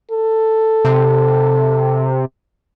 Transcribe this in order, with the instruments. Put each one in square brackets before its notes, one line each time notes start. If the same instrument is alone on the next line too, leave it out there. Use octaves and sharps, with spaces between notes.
[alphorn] A4
[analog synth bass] C3